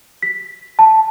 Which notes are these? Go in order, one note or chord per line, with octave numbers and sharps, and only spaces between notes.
B6
A5